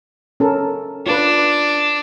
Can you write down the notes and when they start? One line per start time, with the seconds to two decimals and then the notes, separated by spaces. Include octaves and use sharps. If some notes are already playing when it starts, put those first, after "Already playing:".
0.40 C#4 A4 A#4
1.06 D4 F4 B4